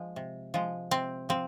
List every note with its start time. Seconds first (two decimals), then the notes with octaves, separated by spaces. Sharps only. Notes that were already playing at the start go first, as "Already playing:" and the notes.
Already playing: F3 G#3
0.16 C3
0.54 F3 G#3
0.91 C3 C4
1.29 F3 C4